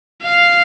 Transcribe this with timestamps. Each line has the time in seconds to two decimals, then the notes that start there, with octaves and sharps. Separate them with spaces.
0.23 F5